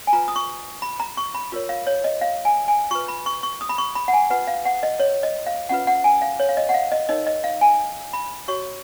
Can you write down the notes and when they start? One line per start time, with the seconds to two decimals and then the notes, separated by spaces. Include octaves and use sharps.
0.07 G#5
0.13 F4 B4 A#5
0.28 D#6
0.36 C#6
0.82 B5
1.00 A#5
1.17 C#6
1.35 B5
1.52 F4 A#4 C#5
1.69 F5
1.87 C#5
2.04 D#5
2.21 F5
2.45 G#5
2.68 G#5
2.91 F4 B4 C#6
3.08 B5
3.26 C#6
3.43 C#6
3.61 D#6
3.69 B5
3.78 C#6
3.95 B5
4.08 F#5
4.13 G#5
4.30 F4 B4 F#5
4.48 F5
4.65 F#5
4.83 D#5
5.00 C#5
5.23 D#5
5.46 F5
5.69 C#4 F4 B4 F#5
5.87 F#5
6.04 G#5
6.22 F5
6.40 C#5
6.49 F5
6.57 D#5
6.69 F#5
6.74 F5
6.92 D#5
7.09 D#4 A#4 C#5 D#5
7.27 D#5
7.44 F5
7.61 G#5
8.13 B5
8.48 F#4 C#5 C#6